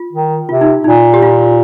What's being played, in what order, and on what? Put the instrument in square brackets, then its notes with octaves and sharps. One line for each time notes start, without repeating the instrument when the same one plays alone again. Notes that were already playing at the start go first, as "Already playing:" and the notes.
Already playing: [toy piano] F4
[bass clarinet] D#3
[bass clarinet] C3 [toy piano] F4
[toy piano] D#4
[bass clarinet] A#2 [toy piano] D#4
[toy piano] G4
F4